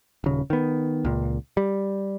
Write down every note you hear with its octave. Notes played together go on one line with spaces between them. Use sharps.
D#1 C#3
D#3 B3
C#2 A#2
G3